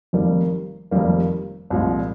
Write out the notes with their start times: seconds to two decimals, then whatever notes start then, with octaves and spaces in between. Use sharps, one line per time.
0.13 F1 F2 D#3 G3 A#3
0.91 F1 F2 D#3 G3 A#3
1.70 C2 A#2 F3 G#3